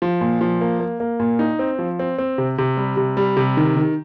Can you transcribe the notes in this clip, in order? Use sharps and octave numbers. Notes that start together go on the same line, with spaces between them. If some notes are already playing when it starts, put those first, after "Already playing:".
F3
A#2
F3
A#3
A#3
A#3
A#2
D#4
C4
F3
C4
C4
C3
C3
G3
C3
G3
C3
D#3
D#3